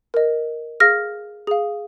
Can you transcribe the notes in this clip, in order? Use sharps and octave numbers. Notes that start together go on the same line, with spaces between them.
A#4 D#5
G#4 F5 F6 A#6
G#4 F5